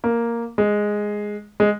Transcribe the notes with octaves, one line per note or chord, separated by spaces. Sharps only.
A#3
G#3
G#3